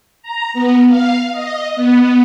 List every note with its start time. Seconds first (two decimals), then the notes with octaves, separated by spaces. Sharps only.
0.22 A#5
0.54 B3
0.88 F5
1.32 D#5
1.76 B3